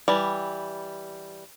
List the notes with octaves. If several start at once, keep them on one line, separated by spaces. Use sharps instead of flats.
E3 G3